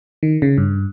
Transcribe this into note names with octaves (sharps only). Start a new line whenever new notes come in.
D#3
C#3
G2